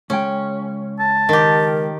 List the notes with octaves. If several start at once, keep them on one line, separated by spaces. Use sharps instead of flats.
C#2 G#3 C#4 G5
A5
D#3 G4 A#4